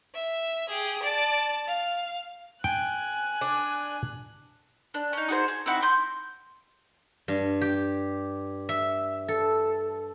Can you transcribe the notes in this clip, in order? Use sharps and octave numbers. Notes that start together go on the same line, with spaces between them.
E5
G4 G#4
D5 A5
F5
G5 G#5 F#6
D4
D4
C#4 D#4
D#4 F#4 G#4 C5
G#4
C4 D#4 E4 F#4
C6 G6
G2
G4
E5
A4